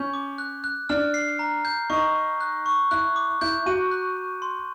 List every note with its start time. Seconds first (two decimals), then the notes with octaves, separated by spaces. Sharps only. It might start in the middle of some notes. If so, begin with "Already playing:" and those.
Already playing: C#4 G6
0.13 D6
0.38 F#6
0.64 F#6
0.89 D4 F6
1.14 C7
1.39 A#5
1.65 G6
1.90 D#4 C#6
2.16 C#6
2.40 F#6
2.66 C#6
2.91 E4 F#6
3.16 D6
3.41 E4 G6
3.66 F#4 D#7
3.91 F#6
4.17 F#6
4.42 C6